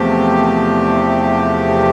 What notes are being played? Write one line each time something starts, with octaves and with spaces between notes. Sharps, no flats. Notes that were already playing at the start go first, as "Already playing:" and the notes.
Already playing: E2 C3 F3 A3 G4